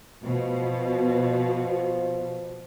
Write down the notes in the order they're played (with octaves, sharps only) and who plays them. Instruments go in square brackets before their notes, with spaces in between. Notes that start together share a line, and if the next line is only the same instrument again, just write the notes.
[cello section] B2 [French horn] F3